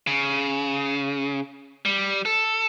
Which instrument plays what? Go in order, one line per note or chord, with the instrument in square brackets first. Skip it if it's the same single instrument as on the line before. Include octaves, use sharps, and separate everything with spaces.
[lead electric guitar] C#3
G3
A4